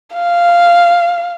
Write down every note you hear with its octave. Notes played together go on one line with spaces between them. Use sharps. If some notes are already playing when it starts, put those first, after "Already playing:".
F5